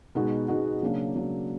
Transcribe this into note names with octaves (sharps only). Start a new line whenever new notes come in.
B2 G#3 B3 D#4 F#4
B2 G#3 B3 D#4 F#4
C#3 F#3 A#3 D4
C#3 F#3 A#3 D4